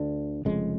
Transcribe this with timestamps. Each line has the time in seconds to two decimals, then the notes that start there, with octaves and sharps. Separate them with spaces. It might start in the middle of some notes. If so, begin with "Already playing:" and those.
Already playing: D2 D3 D4
0.45 F1 F2 C#3 G#3